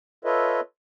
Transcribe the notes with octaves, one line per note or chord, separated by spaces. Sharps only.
F4 A4 B4 C#5 D#5 E5